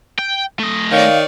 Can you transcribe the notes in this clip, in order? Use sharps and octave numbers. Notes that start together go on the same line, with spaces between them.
G5
A3 D#5
D#3 C#5 D5 F5